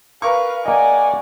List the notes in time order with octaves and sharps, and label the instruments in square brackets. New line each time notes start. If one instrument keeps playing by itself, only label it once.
[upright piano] A#4 C#6 [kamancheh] B4 F5
[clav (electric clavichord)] A#3 D#5 [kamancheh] D5 F#5 [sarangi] G#5